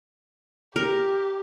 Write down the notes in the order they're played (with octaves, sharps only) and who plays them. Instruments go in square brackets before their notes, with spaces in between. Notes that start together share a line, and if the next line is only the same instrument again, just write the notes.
[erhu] G4 [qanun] A#4